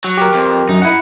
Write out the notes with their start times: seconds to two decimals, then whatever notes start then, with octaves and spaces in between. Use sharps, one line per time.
0.04 F#3
0.17 G4 A#4
0.34 F2
0.69 F#2 D#4
0.82 E4 F#5